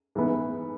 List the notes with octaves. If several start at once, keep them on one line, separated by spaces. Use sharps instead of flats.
G#2 E3 B3